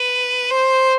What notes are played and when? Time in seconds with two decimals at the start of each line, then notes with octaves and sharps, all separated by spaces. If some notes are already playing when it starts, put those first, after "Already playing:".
Already playing: B4
0.51 C5